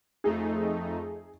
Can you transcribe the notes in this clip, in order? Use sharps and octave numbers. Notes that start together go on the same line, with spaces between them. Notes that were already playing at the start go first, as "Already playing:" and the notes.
F2 A3 D#4 G#4